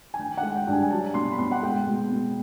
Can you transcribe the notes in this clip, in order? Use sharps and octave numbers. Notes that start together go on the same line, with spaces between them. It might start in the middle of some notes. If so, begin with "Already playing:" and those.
G#5
D#3 G5
F#5
G#3
G5
G2
G#5
G#5
F#3 A5
B2 C6
B5
B2 C6
F#5
G#3 G5
B2
B2